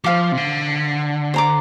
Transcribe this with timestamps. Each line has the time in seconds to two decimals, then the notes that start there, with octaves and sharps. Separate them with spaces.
0.04 F3 C5 F5 D6
0.32 C3
0.37 D3
1.34 C5 A#5 D6